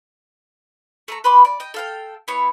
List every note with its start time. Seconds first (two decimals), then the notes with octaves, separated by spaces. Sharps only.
1.08 A3 A4 A#5
1.24 B4 B5 C6 D6
1.45 D5
1.60 D#5 G5
1.74 A4 F5 G5
2.28 B3 E4 C#5